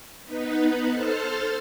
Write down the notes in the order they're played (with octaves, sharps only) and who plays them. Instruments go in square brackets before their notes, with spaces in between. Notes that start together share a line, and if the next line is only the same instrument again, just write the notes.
[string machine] B3 D#4 B4
A4 C5 A5 F6